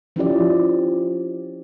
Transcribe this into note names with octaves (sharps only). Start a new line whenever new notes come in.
F3 C#4 E4 G4 D5